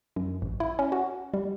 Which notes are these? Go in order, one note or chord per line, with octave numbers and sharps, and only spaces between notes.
F#2
A1
E4
C#4
F#4
G3